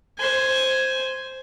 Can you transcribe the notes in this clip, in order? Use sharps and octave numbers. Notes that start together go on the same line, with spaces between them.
C5 G#5